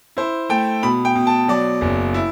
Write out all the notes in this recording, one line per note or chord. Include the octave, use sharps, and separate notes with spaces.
E4 C5
A3 G5
B2 B5
G5
B2
A5
F#3 D5
F#1
E4